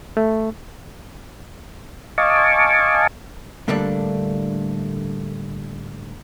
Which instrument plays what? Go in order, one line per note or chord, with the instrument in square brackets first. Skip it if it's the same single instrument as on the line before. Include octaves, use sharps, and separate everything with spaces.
[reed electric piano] A3
[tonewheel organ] D#5 F5 G#5 A5 C#6 D6
[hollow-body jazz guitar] A2 D3 G3 A3 A#3 D4